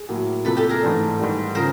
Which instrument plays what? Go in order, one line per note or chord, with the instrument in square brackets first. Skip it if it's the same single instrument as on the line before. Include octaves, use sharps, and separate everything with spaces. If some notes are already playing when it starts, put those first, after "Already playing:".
Already playing: [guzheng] G#4
[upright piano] A2 F#3 A#3
[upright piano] C3 F3 A#3 [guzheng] A4 B4
[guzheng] G4 A4
G#4 A#4
[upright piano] G#2 E3 A3 D4
G#2 D#3 G3
[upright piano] C#3 F3 [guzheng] A#4 C5